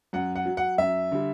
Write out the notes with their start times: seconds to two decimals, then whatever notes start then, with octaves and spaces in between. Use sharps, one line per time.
0.13 F#2 F#5
0.36 F#5
0.45 F#3
0.57 F#5
0.78 F#2 E5
1.12 D3 G3